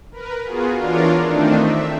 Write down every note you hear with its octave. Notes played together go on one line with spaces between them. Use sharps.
A#4 B4
B3 F4 F#4 G#4
E3 D4 F4 A#4 C#5 D5
D#3 A3 C4 D4 D#4
E5